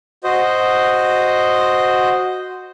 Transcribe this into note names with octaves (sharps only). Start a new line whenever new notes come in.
F#4 C5 D#5